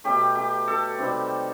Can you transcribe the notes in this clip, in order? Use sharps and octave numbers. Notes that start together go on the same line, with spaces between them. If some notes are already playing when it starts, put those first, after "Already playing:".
B2 F#3 A3 G4
G4
A4
C3 D#3 G3